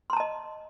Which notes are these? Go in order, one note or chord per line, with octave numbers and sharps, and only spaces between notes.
D#5 A5 A#5 C6